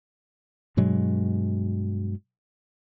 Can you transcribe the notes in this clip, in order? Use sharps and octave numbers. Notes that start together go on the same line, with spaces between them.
G2 B2 F#3 G#3